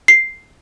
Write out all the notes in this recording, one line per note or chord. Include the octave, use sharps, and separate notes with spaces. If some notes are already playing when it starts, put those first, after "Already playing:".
C7